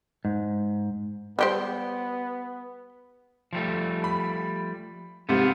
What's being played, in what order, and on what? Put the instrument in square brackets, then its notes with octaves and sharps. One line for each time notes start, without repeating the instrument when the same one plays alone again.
[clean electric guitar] G#2
[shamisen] G3 G4 C5 [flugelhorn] B3
[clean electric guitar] F3 G3 A3
[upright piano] B5
[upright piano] G#2 C3 [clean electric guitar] B3 F4 C5